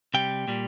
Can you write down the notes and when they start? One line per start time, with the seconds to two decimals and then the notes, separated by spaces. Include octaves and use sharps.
0.14 C3 G3 G5
0.48 A#2 G3